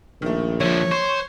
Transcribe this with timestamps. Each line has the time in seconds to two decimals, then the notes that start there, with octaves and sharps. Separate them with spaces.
0.22 A#1 D#3 A3
0.60 D3 F3 C#5 E5
0.91 C5 C#6